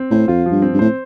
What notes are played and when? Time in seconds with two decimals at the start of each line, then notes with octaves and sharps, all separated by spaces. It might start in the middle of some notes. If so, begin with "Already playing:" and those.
Already playing: C4
0.11 A2 C5
0.28 F2 F4
0.46 F3
0.51 G2
0.62 C4
0.74 G2
0.79 A2 C5